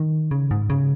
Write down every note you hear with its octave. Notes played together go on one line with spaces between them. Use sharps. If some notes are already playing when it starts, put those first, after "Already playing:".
Already playing: D#3
C#3
G#2
C#3